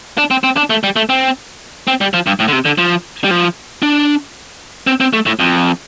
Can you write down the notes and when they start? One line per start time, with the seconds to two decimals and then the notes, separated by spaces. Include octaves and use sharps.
0.18 D4
0.31 C4
0.44 C4
0.57 D4
0.70 A3
0.83 G3
0.96 A3
1.09 C4
1.87 C4
2.01 G3
2.14 F3
2.27 G2
2.40 A2
2.48 D3
2.53 C3
2.65 D3
2.78 F3
3.24 G3
3.31 F3
3.82 D4
4.87 C4
5.00 C4
5.13 A3
5.26 A2
5.39 F2